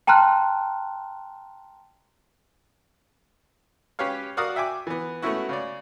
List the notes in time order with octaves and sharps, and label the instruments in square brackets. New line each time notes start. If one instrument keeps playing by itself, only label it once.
[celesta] G5 A5 A#5 C6 F6 F#6
[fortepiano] C#4 G4 B4 C#5 F5
F#4 A#4 D5 F5 F#5 D#6
E5 G5 G#5 D6
E3 B3
A3 B3 C#4 E4 F#4
C#3 C#5 D5